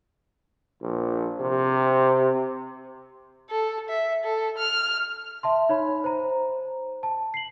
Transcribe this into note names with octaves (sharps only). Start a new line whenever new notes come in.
A#1
C3
A4
E5
A4
F6
E5 A5 C6
D#4 C#5 B5
C5 A#5
A5
C7 F#7